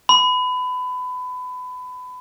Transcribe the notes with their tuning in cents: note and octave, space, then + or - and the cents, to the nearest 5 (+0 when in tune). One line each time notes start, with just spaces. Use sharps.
B5 +25